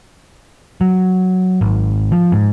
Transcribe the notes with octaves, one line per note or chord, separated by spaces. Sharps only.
F#3
G#1
F3
G#2